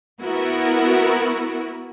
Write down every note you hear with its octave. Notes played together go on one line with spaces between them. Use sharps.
B3 E4 F#4 A#4